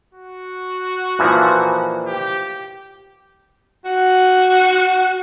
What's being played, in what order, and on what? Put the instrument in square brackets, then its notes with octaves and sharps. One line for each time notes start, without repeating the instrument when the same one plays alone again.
[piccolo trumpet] F#4
[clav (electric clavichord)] A#2 E3 F3
[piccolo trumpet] G4
[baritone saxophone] F#4